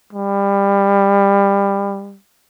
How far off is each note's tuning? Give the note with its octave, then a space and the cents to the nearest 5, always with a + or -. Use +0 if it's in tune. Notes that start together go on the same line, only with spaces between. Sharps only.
G3 +25